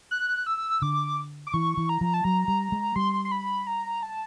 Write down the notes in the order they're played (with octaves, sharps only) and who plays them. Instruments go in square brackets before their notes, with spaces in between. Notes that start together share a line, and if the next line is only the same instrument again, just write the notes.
[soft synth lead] F#6
E6
[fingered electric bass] D3 [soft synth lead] D6
[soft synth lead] D6
[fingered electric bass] E3 [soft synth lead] C#6
[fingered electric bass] E3
[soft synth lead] A#5
[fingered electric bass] F3
[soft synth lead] A5
[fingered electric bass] F#3 [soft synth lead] A#5
[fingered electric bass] G3
G#3
[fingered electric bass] G3 [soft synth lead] C6
[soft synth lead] C6
B5
A#5
A5